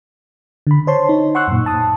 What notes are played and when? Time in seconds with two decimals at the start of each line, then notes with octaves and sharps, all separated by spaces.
0.67 D3 B5
0.87 C5 C#5 A5 C6
1.09 D#4
1.35 F#5 C6 C#6 E6 F#6
1.48 F#2 A#2
1.66 A5 D#6